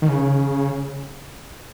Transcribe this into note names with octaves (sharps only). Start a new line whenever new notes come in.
D#3
C#3